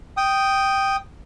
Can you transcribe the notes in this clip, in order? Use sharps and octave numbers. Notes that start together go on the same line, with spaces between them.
G5 D#6